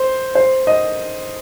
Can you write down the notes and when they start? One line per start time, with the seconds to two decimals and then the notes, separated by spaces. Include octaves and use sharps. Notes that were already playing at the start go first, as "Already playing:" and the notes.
Already playing: C5
0.35 C5
0.67 D#5